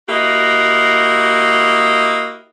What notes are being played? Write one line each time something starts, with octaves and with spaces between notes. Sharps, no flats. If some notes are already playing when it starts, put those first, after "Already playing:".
A#3 E4 F#4 G4 D#5